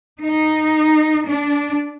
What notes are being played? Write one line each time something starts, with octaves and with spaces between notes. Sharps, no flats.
D#4
D4